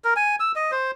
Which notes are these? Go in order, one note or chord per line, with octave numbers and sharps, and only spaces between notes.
A#4
G#5
E6
D#5
C5